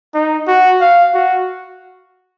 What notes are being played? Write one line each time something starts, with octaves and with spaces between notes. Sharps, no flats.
D#4
F#4
F5
F#4